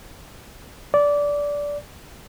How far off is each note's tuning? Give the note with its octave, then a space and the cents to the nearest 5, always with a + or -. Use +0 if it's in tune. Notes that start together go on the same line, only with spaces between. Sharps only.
D5 -15